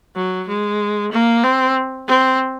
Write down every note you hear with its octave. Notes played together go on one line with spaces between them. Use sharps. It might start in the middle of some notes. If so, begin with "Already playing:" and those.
F#3
G#3
A#3
C4
C4